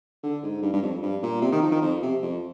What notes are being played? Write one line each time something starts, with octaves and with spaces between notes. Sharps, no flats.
D3
G#2
G2
G2
F2
G2
A#2
C3
D#3
F3
D#3
F2
C3
F2